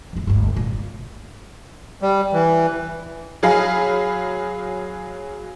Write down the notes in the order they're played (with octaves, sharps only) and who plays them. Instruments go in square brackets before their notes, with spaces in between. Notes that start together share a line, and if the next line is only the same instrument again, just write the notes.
[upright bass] F2 E4
G1 D2
A#2
[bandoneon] G3
E3
[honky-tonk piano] F#3 G#4 F5 B5